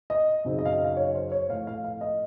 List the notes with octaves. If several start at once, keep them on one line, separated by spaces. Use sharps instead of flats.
D#5
F#2 C#3 F#3 C4 D#4
D#5
F5
D#5
F5
C#5
C5
C#5
A2 F3 A3 F5
F5
F5
D#5